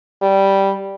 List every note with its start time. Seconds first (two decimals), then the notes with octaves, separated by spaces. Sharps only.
0.22 G3